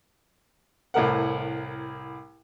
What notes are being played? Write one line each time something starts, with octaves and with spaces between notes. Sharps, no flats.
C2 A2 A#4 F#5